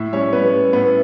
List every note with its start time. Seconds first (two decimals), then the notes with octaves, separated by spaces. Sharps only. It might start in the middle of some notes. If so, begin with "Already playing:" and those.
Already playing: A2 E4 E5
0.13 G3 C#4 C#5
0.33 G3 B3 B4
0.53 A2
0.73 A2 B3 B4